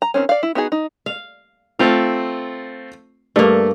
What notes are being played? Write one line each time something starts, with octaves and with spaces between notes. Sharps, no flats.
A#5
D#3 C4 C#4
D5 F5
E4
B3 D#4 F#4 G#4
D#4
F5
A3 C4 F4 F5
G2 A3 A#3